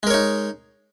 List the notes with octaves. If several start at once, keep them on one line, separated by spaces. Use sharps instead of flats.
G#3 D#4 A#4 C#5